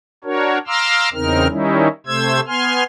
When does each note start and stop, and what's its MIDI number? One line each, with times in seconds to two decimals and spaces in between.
0.24 0.58 62
0.24 0.58 66
0.24 0.58 70
0.24 0.58 73
0.67 1.09 77
0.67 1.09 82
0.67 1.09 84
0.67 1.09 86
0.67 1.09 88
0.67 1.09 89
1.14 1.47 40
1.14 1.47 49
1.14 1.47 60
1.14 1.47 63
1.14 1.47 70
1.14 1.47 89
1.50 1.88 51
1.50 1.88 55
1.50 1.88 61
1.50 1.88 63
1.50 1.88 64
2.07 2.40 48
2.07 2.40 57
2.07 2.40 72
2.07 2.40 88
2.07 2.40 92
2.47 2.84 59
2.47 2.84 80
2.47 2.84 84
2.47 2.84 89